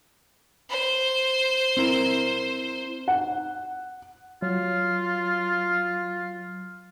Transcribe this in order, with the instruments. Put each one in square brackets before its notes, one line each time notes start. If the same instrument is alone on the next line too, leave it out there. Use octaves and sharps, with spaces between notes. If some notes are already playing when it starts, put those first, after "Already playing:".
[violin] C5
[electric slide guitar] C4 E4 A#4
[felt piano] F#5
[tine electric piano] F#3 [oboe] F4